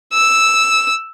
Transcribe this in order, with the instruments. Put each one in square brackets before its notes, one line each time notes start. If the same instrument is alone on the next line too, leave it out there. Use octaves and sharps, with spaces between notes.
[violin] E6